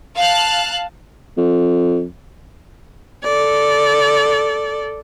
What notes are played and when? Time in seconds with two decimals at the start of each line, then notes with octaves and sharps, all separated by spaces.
0.17 F5 A5 F#6
1.38 F2
3.24 A4 D5